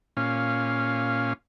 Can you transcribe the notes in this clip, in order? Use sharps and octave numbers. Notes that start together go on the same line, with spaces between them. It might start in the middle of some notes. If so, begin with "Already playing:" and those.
A#2 C#4 F5